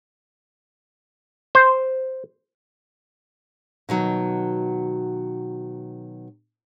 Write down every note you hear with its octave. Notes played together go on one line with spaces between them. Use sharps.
C5
B2 D#3 F#3